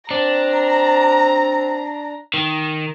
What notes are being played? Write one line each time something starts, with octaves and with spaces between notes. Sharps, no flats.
C4 D4 A#5
D#3